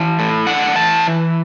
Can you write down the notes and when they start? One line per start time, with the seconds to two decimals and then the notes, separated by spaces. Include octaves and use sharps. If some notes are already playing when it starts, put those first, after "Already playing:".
Already playing: E3 A5
0.19 A2
0.47 D4 F#5
0.75 E3 A5